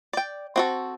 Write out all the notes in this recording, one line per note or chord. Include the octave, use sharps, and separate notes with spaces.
D5 G5
C4 F#4 A4